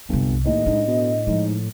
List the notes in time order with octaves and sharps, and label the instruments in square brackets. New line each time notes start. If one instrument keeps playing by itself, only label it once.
[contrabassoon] G1 [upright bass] C2 F#2
[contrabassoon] D#2 [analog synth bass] A2 [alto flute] D#5
[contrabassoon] G#2 [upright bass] D4
[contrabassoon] B2
[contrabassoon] G#2 [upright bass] F3